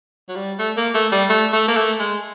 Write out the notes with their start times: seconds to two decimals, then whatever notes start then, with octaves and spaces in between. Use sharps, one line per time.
0.29 F#3
0.36 G3
0.59 A3
0.77 A#3
0.95 A3
1.12 G3
1.29 A3
1.53 A3
1.68 A#3
1.77 A3
1.99 G#3